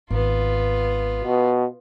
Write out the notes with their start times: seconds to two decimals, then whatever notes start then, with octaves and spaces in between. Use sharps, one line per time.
0.10 G#1 G#2 B3 F4
1.24 B2